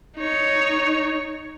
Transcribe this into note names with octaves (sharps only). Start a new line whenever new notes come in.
D#4 C#5